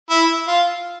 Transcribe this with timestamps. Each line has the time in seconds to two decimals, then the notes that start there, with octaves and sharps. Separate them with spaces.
0.10 E4
0.48 F4